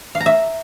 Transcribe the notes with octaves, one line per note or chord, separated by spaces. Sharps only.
F5
A#5
E5